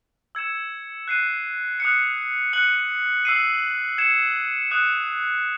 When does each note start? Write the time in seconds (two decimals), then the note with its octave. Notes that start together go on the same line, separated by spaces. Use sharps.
0.35 E6 G#6 C#7 E7
1.08 F#6 C7 D#7
1.80 D#6 F#6 C#7
2.53 F#6 C#7 F#7
3.25 E6 C7 D#7
3.98 G#6 C#7 E7
4.71 D#6 F#6 C#7